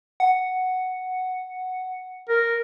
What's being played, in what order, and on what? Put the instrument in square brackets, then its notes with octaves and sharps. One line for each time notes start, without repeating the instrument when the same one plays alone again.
[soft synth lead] F#5
[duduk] A#4